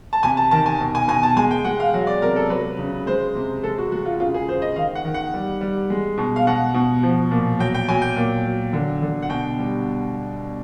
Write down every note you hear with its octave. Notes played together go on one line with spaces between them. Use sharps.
A5
C3 G#5
A5
D#3 A5
G#5
B2
G#5
B2 G#5
A5
G#3 G#5
G5
G#3 F#5
F5
F#3
D5
C3 A#4
A4
F#3 B4
C#3
G#3 C5
C3
G#3 A4
F#4
G#3 F#4
F4
C#3 F4
G#4
C#3 C5
D#5
D#3 F5
F#5
D#3
F#5
G3
G3
G#3
B2
F5
B2 F#5
B2
F3
A#2
F#3 G5
G5
F#3 G#5
G5
A#2
F#3
D3
D3
F#5
B2 G5
G3